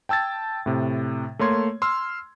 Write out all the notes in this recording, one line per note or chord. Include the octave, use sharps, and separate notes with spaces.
G5 A5 E6 G#6 A6
A2 C3
A3 A#3 C#5 C6 G#6
C6 E6 F6